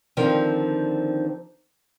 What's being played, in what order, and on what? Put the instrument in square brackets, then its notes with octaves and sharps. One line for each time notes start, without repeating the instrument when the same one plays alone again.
[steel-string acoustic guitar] D3 D#3 F3 C4